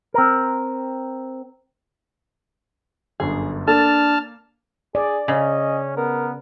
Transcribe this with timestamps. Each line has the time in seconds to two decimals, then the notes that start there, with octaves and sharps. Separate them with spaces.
0.14 C4 A#4
3.20 G1 F#2 D3 G#4
3.68 A#3 D4 A4 A5 F6
4.95 G#4 D5
5.28 C#3 C#4 D#5
5.97 B3 A#4